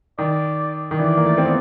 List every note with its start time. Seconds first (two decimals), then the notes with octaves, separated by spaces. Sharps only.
0.18 D#3 D5
0.91 D#3
0.98 E3 D5
1.17 A#3
1.26 A3
1.38 C4
1.45 B3